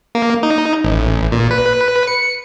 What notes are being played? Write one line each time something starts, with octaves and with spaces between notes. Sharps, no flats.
A#3
D#4
A1
A#2
B4
C#7